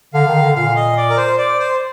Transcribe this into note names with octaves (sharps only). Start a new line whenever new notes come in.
D3 F5
D#3
D3
A#2 F5
D#5
D5
A#4
C5
D5
C5